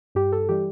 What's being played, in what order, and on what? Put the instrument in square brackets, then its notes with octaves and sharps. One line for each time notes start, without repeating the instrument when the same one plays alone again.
[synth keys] G2 G4
A4
E3 G3 G4